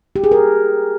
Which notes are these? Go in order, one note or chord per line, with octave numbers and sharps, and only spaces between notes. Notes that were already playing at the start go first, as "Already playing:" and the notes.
G4
G#4
A#4